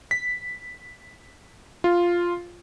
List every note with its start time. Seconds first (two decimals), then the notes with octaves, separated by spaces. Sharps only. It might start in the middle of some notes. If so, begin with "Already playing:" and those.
0.11 B6
1.84 F4